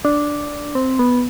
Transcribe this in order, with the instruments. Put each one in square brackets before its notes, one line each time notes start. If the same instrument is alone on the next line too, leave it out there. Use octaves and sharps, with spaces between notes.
[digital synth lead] D4
C4
B3